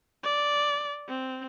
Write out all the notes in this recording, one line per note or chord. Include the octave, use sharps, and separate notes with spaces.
D5
C4